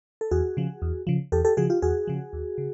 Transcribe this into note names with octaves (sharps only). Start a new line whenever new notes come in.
A4
E2 F#4 G#4
C#3 F3
E2
C#3 F3
E2 G4 A4
G4 A4
C#3 F3 F#4 G#4
F4 G4
E2 F#4 G#4
C#3 F3
D#2
C#3